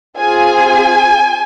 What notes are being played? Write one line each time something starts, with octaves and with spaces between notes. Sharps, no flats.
C4 F4 G#4 G#5